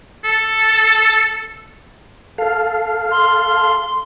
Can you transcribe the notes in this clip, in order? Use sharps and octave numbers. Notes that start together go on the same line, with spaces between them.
A4
A4 F5
C6